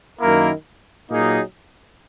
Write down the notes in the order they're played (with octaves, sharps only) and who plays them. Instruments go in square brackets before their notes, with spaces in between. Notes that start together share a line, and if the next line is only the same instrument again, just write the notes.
[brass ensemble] F#2 D#3 A#3 E4 A#4
A#2 F#3 A#3 D#4 G#4